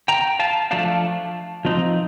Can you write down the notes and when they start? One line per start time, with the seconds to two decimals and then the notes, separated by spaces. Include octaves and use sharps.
0.08 G5 A#5
0.39 F5 A5
0.71 F3 A3 D4 F5 A5
1.65 F3 C4 D#4